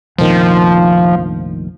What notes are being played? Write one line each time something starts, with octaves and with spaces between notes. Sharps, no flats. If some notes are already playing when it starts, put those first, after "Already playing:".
F1 A#1 D#3 F3